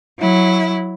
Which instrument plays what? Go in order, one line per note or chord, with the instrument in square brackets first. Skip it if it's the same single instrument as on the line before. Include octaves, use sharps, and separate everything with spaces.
[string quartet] F#3 E4